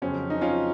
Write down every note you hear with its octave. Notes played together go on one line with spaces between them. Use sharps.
F2 C#3 F#3 C4 C#4
D#4
C#4 F4